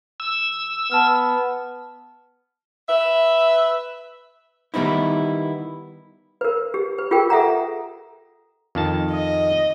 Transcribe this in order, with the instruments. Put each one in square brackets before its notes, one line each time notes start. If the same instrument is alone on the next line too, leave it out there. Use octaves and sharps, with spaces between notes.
[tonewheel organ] E6
[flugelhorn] B3 [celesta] A5 F6
[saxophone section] B4 E5
[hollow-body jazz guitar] D#3 G3 B3 D#4 E4
[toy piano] A#4 B4
G4
B4
F4 G4 G#4 A#4 G5
A4 E5 F#5 A#5
[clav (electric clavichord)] F2 D#3 A5
[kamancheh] D#5